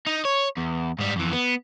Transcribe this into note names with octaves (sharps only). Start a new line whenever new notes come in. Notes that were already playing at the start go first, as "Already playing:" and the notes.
D#4
C#5
E2
G#2 G3
F2 E3
B3